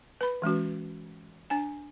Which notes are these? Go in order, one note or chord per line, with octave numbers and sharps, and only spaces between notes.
B4 B5
E3 G#3 C#4 F#4
D4 G#5